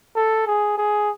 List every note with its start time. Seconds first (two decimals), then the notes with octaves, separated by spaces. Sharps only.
0.16 A4
0.47 G#4
0.78 G#4